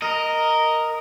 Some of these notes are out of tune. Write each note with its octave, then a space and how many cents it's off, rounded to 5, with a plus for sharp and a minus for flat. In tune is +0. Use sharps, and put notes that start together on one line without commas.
A#4 -5 D#5 +0